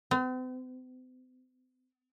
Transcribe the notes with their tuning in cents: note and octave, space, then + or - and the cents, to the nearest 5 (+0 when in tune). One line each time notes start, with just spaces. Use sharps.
C4 -45